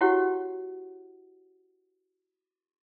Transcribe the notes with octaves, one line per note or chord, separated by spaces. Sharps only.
E4 F#4 G4 C#5 F#5